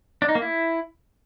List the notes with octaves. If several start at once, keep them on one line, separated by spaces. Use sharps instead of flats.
D4
D#4
A#3
E4